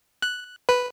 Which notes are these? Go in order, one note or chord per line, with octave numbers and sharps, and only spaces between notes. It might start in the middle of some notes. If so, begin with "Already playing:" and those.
F#6
B4